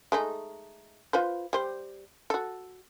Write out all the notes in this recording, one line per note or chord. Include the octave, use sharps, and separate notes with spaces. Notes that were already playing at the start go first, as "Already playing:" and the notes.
G#3 A3 D#4
F4 B4 C5
G3 C5
F#4 A4